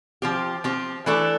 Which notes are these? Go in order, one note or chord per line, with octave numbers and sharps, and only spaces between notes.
F3 C4 G4
F3 C4 G4
E3 A3 D4 A4